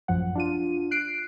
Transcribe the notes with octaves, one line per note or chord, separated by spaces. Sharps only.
A1 F#2 F3 F#5
D4 F4 D#7
F#6 C7 D7